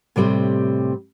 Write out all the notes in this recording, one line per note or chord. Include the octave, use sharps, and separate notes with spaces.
A2 C3 G3 C4